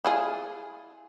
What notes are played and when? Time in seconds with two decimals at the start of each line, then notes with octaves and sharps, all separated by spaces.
0.05 E4 F4 G#4